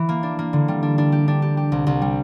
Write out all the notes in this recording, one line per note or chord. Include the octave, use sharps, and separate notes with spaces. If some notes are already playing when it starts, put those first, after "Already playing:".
Already playing: E3
A#3
D4
A#3
D3
G3
D4
D4
G4
D4
G4
G4
C2
C2
G3